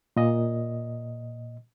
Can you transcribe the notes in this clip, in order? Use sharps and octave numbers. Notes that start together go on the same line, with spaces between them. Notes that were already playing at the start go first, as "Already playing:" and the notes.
A#2 D#5